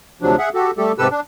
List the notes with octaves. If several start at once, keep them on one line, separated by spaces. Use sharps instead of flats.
D2 C3 F3 F#3 D4
G#4 E5 F#5
F#4 G4 A4
G3 A3 G4 A4
G#2 C3 G4 A4 B4 E6
D4